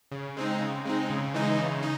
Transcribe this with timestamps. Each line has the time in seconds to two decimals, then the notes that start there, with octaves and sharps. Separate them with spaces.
0.11 C#3
0.37 G#3 C4 D#4
0.61 C#3
0.85 G#3 C4 D#4
1.10 C#3
1.34 E3 G#3 D#4
1.59 C#3
1.82 D#4